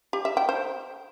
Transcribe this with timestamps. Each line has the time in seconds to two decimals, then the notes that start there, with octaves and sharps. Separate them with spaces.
0.13 G4
0.25 E5
0.37 G5
0.49 C5